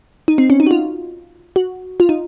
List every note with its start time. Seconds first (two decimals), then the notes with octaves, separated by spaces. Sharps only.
0.28 D#4
0.38 C4
0.50 C#4
0.60 D#4
0.66 F#4
0.71 F4
1.56 F#4
2.00 F4
2.09 D#4